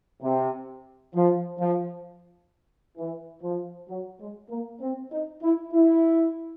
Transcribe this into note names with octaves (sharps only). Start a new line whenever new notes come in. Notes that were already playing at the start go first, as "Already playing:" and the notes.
C3
F3
F3
E3
F3
F#3
G#3
A#3
C4
D#4
E4
E4